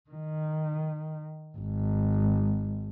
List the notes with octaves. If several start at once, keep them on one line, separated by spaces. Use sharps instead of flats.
D#3
G#1